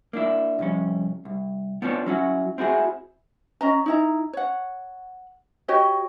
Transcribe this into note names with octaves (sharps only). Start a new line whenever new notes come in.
A#3 D4 E4
C2 F2 C#4
C2
B3 C4 D4 F4 B4 C#5
F#3 C#4 E4 F#4
C4 E4 F#4 G#4
C#4 D#5 A#5
D#4 E4 A#5
C#5 F#5
F#4 G4 C#5 D#5